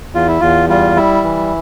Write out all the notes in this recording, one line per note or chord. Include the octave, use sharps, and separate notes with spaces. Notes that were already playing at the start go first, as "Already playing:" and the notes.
E2 F4
E4
E2 F4
G3 F4
G3 E4
E3